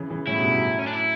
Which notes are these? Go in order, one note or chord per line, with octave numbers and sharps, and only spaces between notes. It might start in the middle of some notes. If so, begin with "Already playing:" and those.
Already playing: C#3 E3
C#3 E3
A2 C#3 E4
G2 B2
F#2 A2
C#4
D4
E4